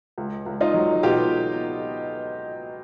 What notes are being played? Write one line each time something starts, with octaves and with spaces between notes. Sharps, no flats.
C#2
C#2
D#4 F4
F#3
B2 F4 G4